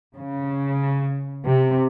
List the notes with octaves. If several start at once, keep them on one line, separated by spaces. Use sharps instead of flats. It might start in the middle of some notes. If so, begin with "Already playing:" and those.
C#3
C3